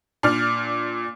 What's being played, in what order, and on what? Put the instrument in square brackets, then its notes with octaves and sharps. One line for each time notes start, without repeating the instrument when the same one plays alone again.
[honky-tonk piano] A#2 D4 F6